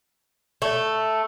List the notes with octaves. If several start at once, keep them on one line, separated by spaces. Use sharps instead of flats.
A3